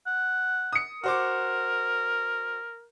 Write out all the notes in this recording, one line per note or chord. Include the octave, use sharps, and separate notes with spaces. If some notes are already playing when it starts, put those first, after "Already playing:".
F#5
D#6 C#7
F#4 A#4 C5 D6